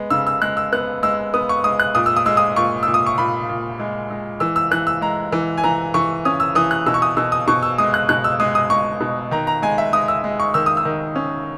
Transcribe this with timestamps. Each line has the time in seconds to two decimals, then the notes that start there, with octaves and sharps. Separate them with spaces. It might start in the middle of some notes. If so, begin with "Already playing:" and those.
Already playing: G#3 B3
0.10 C#3 E6
0.27 E6
0.42 G#3 F#6
0.57 E6
0.72 B3 F#6
1.03 G#3 E6
1.34 B3 D#6
1.49 C#6
1.64 G#3 D#6
1.80 F#6
1.95 A#2 D#6
2.06 E6
2.17 D#6
2.26 G#3 E6
2.37 D#6
2.56 A#2 C#6
2.83 A#2 E6
2.94 D#6
3.06 C#6
3.18 A#2 B5
3.49 A#2
3.80 G#3
4.10 G#3
4.40 E3 E6
4.56 E6
4.71 E3 F#6
4.87 E6
5.02 G#3 A#5
5.32 E3
5.58 G#5
5.64 E3 A#5
5.94 E3 C#6
6.25 C#4 D#6
6.40 E6
6.55 E3 D#6
6.71 F#6
6.86 B2 E6
6.94 C#6
7.02 D#6
7.17 B2 E6
7.32 D#6
7.48 B2 C#6
7.63 E6
7.78 G#3 D#6
7.94 F#6
8.09 B2 F#6
8.24 E6
8.40 G#3 D#6
8.55 D#6
8.70 G#3 C#6
9.01 B2
9.31 D#3 A#5
9.47 A#5
9.62 G#3 G#5
9.78 E5
9.93 G#3 D#6
10.08 E6
10.24 G#3
10.40 C#6
10.54 D#3 E6
10.66 D#6
10.77 E6
10.85 D#3
11.15 C#4